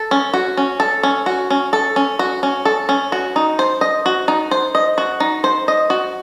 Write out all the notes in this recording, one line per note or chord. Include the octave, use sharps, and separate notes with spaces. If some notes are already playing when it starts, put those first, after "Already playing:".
Already playing: A4
C#4
F#4
C#4
A4
C#4
F#4
C#4
A4
C#4
F#4
C#4
A4
C#4
F#4
D#4
C5
D#5
F#4
D#4
C5
D#5
F#4
D#4
C5
D#5
F#4